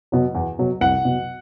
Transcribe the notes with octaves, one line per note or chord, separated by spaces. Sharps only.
B2 F#3
E2
B2 F#3
C2 F#5
B2 F#3